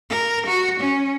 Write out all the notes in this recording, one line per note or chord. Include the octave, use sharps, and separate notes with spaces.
A#4
F#4
C#4